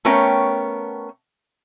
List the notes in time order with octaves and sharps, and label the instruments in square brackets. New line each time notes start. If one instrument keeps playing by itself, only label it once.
[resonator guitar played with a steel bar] A3 B3 C#4 A#4 C#5 G5